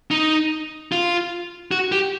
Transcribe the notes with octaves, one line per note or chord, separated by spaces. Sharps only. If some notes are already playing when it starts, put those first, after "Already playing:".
D#4
F4
F#4
G4